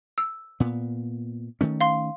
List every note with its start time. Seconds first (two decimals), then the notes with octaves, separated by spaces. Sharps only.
0.18 E6
0.60 A#2 B3
1.61 D#3 A3 C#4
1.81 F5 C6